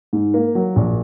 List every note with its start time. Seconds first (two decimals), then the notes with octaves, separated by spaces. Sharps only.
0.13 G#2
0.34 A#3
0.55 F#3
0.76 A#1